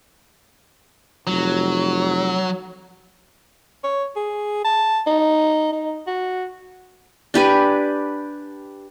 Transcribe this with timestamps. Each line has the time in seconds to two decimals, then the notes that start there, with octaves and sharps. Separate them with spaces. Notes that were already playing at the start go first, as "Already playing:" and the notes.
1.27 F1 F#3
3.84 C#5
4.16 G#4
4.65 A5
5.07 D#4
5.73 D#4
6.07 F#4
7.34 D4 G4 B4 G#5